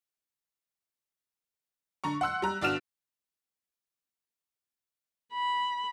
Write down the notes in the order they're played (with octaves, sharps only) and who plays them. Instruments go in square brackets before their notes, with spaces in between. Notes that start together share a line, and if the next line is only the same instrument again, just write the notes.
[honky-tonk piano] D3 A#5 C#6
F#5 C6 E6 F#6
G3 A#5 F#6
G1 D4 F#4 F6 E7 F7
[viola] B5